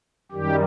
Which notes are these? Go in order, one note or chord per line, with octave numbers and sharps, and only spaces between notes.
F#2 D#3 G3 G4